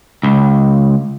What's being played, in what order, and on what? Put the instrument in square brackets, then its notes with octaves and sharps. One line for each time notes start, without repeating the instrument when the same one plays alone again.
[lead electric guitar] C#2